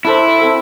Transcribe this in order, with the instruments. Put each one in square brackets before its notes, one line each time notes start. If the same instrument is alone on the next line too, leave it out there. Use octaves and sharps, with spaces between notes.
[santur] D4 A4 C5 [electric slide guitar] E4
[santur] C4 A4 E5